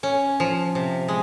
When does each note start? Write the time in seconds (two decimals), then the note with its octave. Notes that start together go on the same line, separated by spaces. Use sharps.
0.03 C#4
0.40 F3
0.75 C3
1.08 G#3